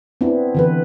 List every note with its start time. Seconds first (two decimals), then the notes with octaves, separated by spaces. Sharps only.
0.21 B3 C4 D4 E4
0.55 D3 E3 B4